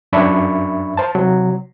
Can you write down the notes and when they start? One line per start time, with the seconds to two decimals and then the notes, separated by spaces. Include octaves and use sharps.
0.13 F#2 D4 E5 B5 C#6
0.97 C5 A5
1.15 C3 F#3